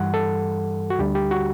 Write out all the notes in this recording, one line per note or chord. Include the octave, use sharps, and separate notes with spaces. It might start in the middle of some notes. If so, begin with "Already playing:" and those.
Already playing: G2 E3 G3 F#5
A4
F#4
D2 D3 G3 G4
G4
F#4